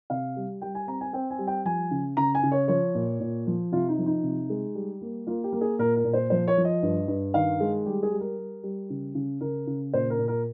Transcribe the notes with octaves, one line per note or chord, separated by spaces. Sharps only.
C3 F5
G3
G3 G5
G#5
C4 A#5
G#5
C4 G5
G#5
G3
G5
F3 G#5
C#3
C#3 A#5
G#5
C#3
C#5
F3 C#5
A#2
A#2
F3
C3 F4
D#4
F3
D#4
C3
G#3
G3
A#3
A#3 F4
G4
A#3
G#4
A#2 A#4
A#4
A#2
C5
F3 C5
C#5
F3
D#5
G2
G2
D#3 F5
G#3
G3 G4
G#4
G3
A#4
G3
G3
C#3
C#3
C#3 A#4
C#3
A#2 C5
A#4
A#2
A#4